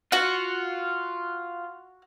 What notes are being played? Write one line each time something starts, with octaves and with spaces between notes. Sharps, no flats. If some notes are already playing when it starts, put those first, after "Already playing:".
F4 F#4 F#5